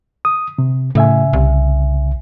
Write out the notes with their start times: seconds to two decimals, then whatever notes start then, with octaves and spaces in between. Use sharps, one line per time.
0.25 D#6
0.58 C3
0.95 A2 C#3 E5 G#5
1.33 C2